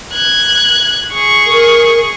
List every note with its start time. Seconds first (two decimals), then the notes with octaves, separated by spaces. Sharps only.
0.13 F#6 G#6
1.11 G#4 C#6
1.47 A#4